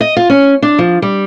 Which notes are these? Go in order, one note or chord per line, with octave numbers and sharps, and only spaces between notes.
D#5
F4
C#4
D4
F3
G3